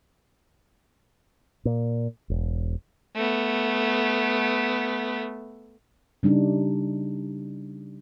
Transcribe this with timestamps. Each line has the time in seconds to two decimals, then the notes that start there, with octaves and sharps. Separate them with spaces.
1.65 A#2
2.30 E1
3.15 A3 B3
6.23 C#3 G3 D4 D#4